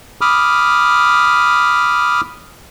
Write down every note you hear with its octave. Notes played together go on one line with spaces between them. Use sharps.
B5 D6 D#6 F6